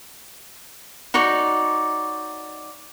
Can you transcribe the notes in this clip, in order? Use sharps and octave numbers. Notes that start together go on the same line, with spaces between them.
D#4 F#4 C#5 D5